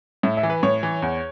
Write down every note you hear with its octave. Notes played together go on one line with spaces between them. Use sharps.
A2 E5
E5
E3
B4
A2 C#5
E3
E2